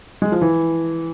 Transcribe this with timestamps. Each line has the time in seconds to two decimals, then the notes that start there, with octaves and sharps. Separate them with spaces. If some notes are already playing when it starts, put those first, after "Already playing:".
0.22 G#3
0.32 F3
0.41 E3